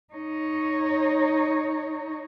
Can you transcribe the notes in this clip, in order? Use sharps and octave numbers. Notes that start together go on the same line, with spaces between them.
D#4 C#5